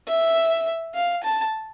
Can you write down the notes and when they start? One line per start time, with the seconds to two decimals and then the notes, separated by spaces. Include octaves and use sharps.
0.08 E5
0.95 F5
1.24 A5